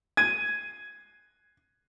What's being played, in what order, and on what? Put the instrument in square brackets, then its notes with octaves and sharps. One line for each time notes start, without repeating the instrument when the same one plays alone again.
[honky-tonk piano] G#6 D#7